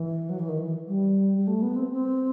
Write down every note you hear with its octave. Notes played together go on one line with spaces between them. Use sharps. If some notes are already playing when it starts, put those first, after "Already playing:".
Already playing: E3
F#3
E3
D#3
E3
G3
G3
A3
B3
C4
C4